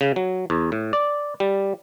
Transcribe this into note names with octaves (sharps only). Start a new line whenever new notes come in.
C#3
F#3
E2
A2
D5
G3